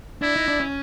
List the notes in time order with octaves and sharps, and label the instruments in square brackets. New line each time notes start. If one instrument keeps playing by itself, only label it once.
[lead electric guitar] D4 [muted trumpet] E4
[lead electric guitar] D#4
D4
C#4